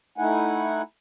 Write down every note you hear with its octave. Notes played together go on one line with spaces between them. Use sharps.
A3 D#4 E4 F#5 G#5